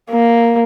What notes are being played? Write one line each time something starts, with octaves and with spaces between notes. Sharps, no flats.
A#3